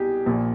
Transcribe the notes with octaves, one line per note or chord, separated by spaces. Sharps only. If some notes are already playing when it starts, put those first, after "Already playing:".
Already playing: C2 B2 G4 G#4
A#1 A#2